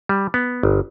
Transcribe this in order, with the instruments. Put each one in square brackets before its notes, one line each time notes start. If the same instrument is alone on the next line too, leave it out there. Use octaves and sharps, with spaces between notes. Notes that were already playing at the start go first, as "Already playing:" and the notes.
[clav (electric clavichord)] G3
B3
G1